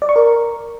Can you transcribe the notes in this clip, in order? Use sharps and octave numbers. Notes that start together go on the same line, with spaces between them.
D5
C#6
A#4